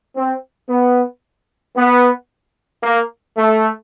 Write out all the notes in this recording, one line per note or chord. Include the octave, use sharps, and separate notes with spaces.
C4
B3
B3
A#3
A3